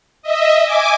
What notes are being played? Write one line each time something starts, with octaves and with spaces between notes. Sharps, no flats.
D#5 E5
G#5 D6